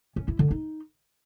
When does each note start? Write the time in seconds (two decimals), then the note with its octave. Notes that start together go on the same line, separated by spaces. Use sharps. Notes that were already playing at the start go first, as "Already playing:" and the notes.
0.16 C#4
0.28 E4
0.39 D3
0.51 D#4